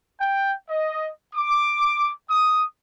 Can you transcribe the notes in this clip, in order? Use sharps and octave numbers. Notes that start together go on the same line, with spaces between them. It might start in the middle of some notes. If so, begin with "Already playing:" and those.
G5
D#5
D6
D#6